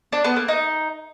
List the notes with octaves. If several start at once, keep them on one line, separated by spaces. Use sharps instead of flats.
D4
B3
A#3
D#4